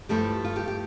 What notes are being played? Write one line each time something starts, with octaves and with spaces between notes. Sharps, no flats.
G2 F3 A3 E4 G4
F4
G4
G4